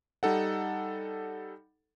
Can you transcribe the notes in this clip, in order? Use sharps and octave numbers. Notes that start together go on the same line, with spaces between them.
G3 D#4 A4 F#5